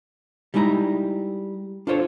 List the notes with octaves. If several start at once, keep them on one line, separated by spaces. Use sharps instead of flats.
G3 G#3 D#4 E4 G#5 A#5
D4 F4 A4 C5 C#5